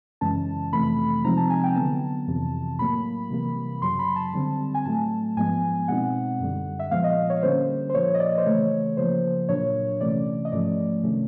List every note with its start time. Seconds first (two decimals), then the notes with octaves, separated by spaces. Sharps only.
0.21 F#2 C#3 E3 G#3 C#4 A5
0.73 F2 C3 E3 A3 B5
1.24 C3 F3 G#3 C4 D#4 A#5
1.37 A5
1.50 G#5
1.64 G5
1.76 D3 F#3 B3 A5
2.27 F2 C3 E3
2.79 A2 F#3 A#3 B5
3.30 C3 E3 G3 A#3
3.82 F#2 C#3 F#3 C6
3.99 B5
4.16 A5
4.34 D3 G3 C4
4.74 G#5
4.85 A2 F#3 A3 A5
5.36 G#2 F3 G#3 B3 G#5
5.88 B2 G#3 C4 D#4 F#5
6.40 F#2 D3 G3
6.79 E5
6.91 A#2 F3 G#3 B3 F5
7.04 D#5
7.30 C#5
7.43 D3 G3 A#3 C#4 C5
7.90 C5
7.94 A#2 F3 A#3 C#5
8.14 D#5
8.20 D5
8.38 C5
8.46 C#3 E3 A3 C#5
8.97 C#3 F3 A#3 C5
9.49 A#2 F#3 A#3 D4 C#5
10.01 C3 E3 A3 C#4 D5
10.45 D#5
10.52 G#2 F3 A3 C#4 D5
11.03 C3 D#3 F#3 A3 C#4